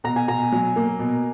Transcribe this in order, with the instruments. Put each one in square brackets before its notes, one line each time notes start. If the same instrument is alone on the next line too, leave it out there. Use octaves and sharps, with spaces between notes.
[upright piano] B2 [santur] A#5
[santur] G#5
[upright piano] B2 [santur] A#5
[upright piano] F#3
A#3
B2